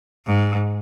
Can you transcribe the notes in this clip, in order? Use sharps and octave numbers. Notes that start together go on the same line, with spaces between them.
G#2